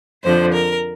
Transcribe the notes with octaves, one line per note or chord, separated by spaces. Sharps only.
F2 D3 F3 C5
A#4